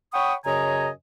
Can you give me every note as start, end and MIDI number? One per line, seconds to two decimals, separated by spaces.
0.13 0.33 73
0.13 0.33 78
0.13 0.33 79
0.13 0.33 83
0.13 0.33 85
0.13 0.33 87
0.45 0.88 42
0.45 0.88 49
0.45 0.88 73
0.45 0.88 75
0.45 0.88 80
0.45 0.88 82